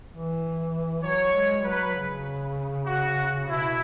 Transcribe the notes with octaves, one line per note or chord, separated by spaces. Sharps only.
E3
F#3 C#5
G#3
F#3 B4
C#3
F#4
B2 E4